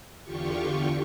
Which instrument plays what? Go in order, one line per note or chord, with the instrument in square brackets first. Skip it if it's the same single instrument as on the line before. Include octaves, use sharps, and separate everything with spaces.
[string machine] E2 D3 F4 G4 C#6